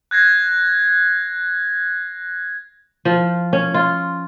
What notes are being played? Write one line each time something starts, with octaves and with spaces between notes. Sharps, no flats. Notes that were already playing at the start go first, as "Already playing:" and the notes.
F#6 G#6 A#6 C7
F3
C#4
F4